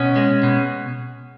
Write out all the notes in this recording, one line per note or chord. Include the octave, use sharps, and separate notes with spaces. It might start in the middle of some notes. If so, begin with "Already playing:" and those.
Already playing: B2 C#4
G#3
B2